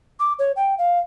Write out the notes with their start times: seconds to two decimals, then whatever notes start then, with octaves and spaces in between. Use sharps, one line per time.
0.20 D6
0.39 C#5
0.56 G5
0.78 F5